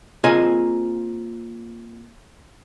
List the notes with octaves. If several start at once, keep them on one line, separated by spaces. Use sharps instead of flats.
A#3 C4 F4 G#4 D#5 G#5